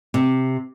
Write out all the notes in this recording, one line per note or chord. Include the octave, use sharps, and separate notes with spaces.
C3